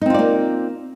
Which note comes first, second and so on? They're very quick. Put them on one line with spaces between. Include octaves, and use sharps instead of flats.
D#4 C4 F4 D5 A#3